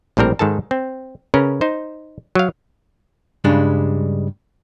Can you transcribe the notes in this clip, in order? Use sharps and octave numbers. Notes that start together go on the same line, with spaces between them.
A#1 A2 G3 C4 A#4
G#2 D#3 A4 A5
C4
C#3 C#4 A#4 B4
D#4 C5
F#3 F5
G2 C#3 G3 G#3 D4